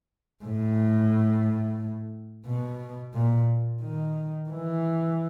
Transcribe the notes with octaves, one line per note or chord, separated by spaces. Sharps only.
A2
B2
A#2
D#3
E3